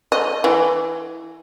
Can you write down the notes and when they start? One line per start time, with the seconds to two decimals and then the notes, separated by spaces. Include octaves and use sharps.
0.12 D#5
0.44 E3